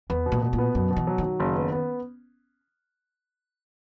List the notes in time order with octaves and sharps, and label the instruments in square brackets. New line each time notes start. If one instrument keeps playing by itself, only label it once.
[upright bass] E2 [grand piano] B3
[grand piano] B2
[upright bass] A#2
[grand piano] B2
[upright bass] A#2
[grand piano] B3
[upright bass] F#2 [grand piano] B2
[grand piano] B2
[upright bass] E3
[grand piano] F#3
[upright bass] D#3 [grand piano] F#3
[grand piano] F#1
B3
B3